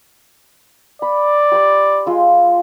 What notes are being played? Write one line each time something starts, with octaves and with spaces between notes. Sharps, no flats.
D5 B5
G4 B5 C6
G#3 F4 E6